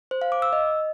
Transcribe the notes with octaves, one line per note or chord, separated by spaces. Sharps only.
C5
F5
D6
E6
D#5